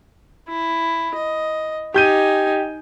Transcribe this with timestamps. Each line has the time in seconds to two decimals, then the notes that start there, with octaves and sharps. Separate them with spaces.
0.48 E4
1.15 D#5
1.94 D#4 G4 G#5 G6 D#7